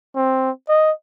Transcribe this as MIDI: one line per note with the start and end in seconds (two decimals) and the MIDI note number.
0.16 0.51 60
0.69 0.91 75